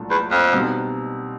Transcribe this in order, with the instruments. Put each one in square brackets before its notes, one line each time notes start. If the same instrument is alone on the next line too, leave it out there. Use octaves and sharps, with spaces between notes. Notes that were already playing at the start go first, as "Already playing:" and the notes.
Already playing: [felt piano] C2 A#2 F#3 A3 D4
[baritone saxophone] E2
F2
[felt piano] B2 G3 C4 D#4